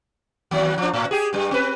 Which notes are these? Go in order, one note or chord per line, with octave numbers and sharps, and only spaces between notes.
D#2 F#3
F3 D4
A2
G4 G#4
G2 G3
C4 B4